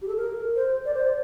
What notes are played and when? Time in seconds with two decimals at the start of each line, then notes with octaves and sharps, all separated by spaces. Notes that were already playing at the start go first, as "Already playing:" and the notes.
0.02 G4
0.08 A4
0.17 A#4
0.56 C5
0.85 D5
0.94 C5
1.04 D5